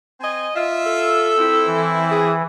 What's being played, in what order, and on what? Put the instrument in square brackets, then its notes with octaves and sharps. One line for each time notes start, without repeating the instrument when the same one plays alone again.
[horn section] C4 D#5 G#5
[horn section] F4 E5 [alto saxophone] D#5
[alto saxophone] A4
[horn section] C4 E4
[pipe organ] E3
[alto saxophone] G#4